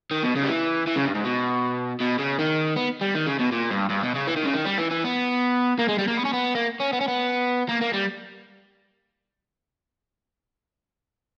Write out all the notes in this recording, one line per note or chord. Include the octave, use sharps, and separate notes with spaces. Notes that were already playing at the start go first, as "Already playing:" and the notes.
D#3
B2
C#3
G3
E3
E3
C#3
G2
G#2
B2
B2
C#3
D#3
B3
G3
D#3
C#3
B2
A#2
G2
G2
B2
C#3
E3
D#3
C#3
D#3
G3
E3
E3
B3
A#3
G#3
G3
A#3
B3
C#4
B3
A#3
C#4
B3
C#4
B3
A#3
A#3
G3